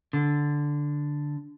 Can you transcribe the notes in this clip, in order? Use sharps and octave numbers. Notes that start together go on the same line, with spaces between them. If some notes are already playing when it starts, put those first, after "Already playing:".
D3